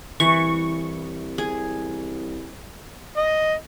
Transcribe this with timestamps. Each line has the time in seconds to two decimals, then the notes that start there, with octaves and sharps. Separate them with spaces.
0.20 C2 E3 C#6
1.38 G#4
3.17 D#5